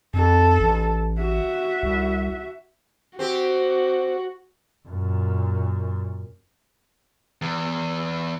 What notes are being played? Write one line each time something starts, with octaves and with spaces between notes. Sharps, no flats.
F2 A4
A1
F#4 E5
C2
C4 F#4 G4
F#2 A#2
E2